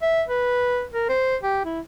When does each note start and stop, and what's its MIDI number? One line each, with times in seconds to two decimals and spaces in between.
0.02 0.22 76
0.28 0.84 71
0.93 1.09 70
1.09 1.36 72
1.42 1.61 67
1.65 1.80 64